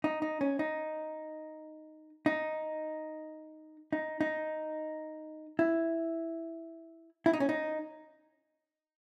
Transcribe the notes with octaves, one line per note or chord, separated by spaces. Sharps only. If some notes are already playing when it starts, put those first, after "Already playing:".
D#4
D#4
C#4
D#4
D#4
D#4
D#4
E4
E4
D#4
C#4
D#4